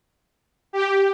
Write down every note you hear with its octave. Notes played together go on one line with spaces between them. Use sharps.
G4